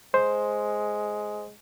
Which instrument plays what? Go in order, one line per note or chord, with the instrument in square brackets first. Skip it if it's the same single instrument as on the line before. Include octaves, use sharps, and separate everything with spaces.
[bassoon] G#3 [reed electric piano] C5